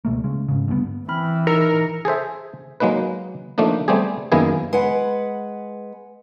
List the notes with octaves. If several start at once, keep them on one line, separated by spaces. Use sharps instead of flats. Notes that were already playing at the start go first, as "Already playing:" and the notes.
C#2 B2 A3 A#3
C#3 G#3
G#2 C#3
D2 G2 G3 B3
E3 C4 B5 F6
D#4 A#4 E6 C#7
G#4 A4 C5 E5
F#3 G#3 A#3 D#4 B4
F3 A3 A#3 D4 D#4
G3 A3 B3 C4 G4 G#4
F#2 D#3 A#3 B3 E4 G#4
G#3 B4 F#5